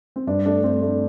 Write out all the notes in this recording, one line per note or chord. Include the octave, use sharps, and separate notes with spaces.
C4
G2 D4
A3 D4
A3 C4
A3 D4